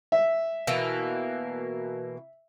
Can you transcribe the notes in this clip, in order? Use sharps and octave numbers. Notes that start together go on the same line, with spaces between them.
E5
B2 E3 A#3